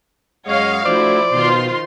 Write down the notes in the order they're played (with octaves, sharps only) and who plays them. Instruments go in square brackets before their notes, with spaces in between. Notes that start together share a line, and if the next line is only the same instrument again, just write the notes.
[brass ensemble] F#2 G#3 F#5 [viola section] C#5 D#5 F5
[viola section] F3 E4 [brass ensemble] A3 D4 F#4 [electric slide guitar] C5 [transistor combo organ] D5
[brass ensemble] B2 [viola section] D#3 F4 C6